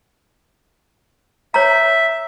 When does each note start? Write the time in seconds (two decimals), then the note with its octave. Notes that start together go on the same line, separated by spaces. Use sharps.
1.54 C#5 E5 A#5